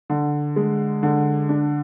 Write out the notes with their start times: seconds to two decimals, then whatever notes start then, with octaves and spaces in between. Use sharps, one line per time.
0.10 D3
0.56 G#3
1.03 D3
1.49 D4